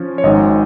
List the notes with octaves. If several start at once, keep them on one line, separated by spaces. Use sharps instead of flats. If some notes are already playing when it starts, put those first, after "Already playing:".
Already playing: F3 C#4
C#5
G#1 G#2 G#3 D#4 D#5